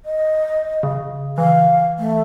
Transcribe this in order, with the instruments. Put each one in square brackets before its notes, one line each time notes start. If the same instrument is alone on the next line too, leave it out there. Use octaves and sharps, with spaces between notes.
[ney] D#5
[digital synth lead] C#3
[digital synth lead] E3 [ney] F5
[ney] A3